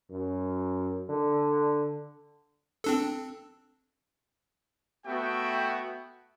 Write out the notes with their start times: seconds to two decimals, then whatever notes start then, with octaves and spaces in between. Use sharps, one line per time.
0.10 F#2
1.09 D3
2.84 C4 D4 A4
5.06 A3 B3 F#4 E5 G5